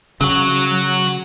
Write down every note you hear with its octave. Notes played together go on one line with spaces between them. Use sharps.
C#3 F#3 F#4